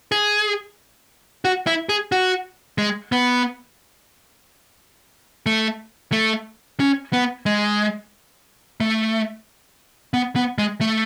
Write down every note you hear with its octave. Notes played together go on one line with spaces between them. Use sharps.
G#4
F#4
E4
G#4
F#4
G#3
B3
A3
A3
C#4
B3
G#3
A3
B3
B3
G#3
A3